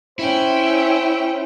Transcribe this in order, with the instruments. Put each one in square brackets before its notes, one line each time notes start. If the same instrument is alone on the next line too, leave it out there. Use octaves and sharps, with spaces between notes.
[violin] C#4 G5 [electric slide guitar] E4 [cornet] C5